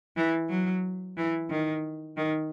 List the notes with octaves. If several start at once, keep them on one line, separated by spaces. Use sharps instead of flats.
E3
F#3
E3
D#3
D#3